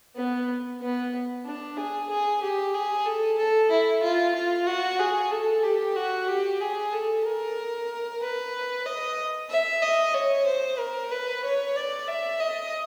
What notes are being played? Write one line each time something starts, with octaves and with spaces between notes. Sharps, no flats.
B3
B3
D4
G#4
G#4
G4
G#4
A4
A4
E4
F4
F4
F#4
G#4
A4
G4
F#4
G4
G#4
A4
A#4
B4
D#5
E5
D#5
C#5
C5
A#4
B4
C#5
D5
E5
D#5